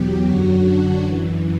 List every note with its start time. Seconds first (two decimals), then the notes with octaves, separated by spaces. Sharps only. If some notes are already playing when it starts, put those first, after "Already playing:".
Already playing: E2 B2 F#3 G4
0.24 F#2 D3 F#3 F#4
0.63 D4
1.02 F#2 E3